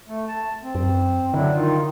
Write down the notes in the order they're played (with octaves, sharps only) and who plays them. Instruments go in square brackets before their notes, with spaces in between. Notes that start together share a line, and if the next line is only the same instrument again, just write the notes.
[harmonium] A3
A5
C4
[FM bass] F#2
[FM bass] D3 [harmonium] F#3 D4 E4
[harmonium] D#3 D#4 F4